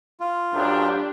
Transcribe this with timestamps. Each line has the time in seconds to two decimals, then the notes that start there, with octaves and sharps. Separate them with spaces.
0.20 F4
0.53 A1 F#2 D4 G4